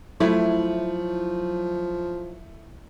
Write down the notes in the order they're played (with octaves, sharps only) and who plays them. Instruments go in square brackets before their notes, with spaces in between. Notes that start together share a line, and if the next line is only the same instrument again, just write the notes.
[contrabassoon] F3 [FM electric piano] F#3 [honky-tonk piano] A3 [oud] E4